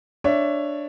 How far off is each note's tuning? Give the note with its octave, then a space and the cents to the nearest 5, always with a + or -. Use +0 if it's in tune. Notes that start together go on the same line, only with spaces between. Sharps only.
D4 +0 C#5 +0 E5 +20